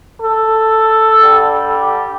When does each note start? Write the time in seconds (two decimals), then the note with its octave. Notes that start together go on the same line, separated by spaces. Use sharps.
0.23 A4
1.17 D3 G3
1.80 G4